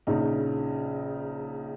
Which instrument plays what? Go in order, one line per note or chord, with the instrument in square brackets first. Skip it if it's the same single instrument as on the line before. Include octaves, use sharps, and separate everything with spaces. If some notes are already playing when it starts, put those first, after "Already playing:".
[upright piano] A#1 C#3 D#4